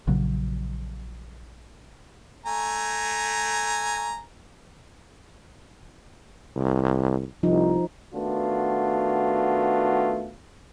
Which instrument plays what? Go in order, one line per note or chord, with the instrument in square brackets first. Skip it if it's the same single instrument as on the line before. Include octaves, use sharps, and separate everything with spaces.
[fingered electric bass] A#1 C#3 F#3
[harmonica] A3 G#5 A#5
[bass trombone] C2
[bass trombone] C2 [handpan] F3 D#4
[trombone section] D#3 A3 B3 D4 F4 F#4